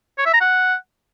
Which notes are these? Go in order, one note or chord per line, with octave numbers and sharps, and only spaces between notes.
C#5
E5
A#5
F#5